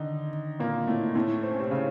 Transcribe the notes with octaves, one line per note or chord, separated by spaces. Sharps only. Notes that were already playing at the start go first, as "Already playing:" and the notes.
Already playing: D3 D#3 D#4
A#2 A#3
A2 A3
A2 A3
C4
C#4
C3 C4
C#3 C#4